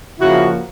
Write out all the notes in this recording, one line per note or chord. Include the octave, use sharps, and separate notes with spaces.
C#3 F3 A#3 E4 F#4